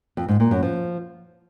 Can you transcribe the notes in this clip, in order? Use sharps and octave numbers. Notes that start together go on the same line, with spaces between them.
F2
G#2
A#2
F#2
F3